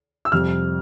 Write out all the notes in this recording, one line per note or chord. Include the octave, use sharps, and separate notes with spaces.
E6
F2 C3 G3 F6